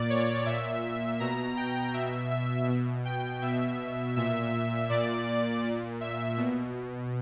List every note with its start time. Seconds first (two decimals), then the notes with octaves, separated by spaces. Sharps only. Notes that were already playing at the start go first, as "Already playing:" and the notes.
Already playing: A#2 D5
0.10 C#5
0.46 A#2 E5
1.20 B2 A#5
1.57 G5
1.93 B2 E5
2.31 E5
2.68 B2
3.05 G5
3.42 B2 E5
4.16 A#2 E5
4.89 A#2 D5
5.27 D5
5.63 A#2
6.01 E5
6.37 B2